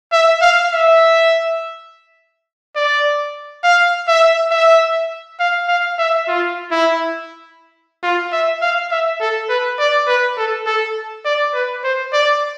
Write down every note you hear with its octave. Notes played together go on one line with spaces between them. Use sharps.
E5
F5
E5
D5
F5
E5
E5
F5
F5
E5
F4
E4
F4
E5
F5
E5
A4
B4
D5
B4
A4
A4
D5
B4
C5
D5